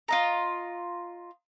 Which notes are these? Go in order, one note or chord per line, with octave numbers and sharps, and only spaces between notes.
F4 D#5 A#5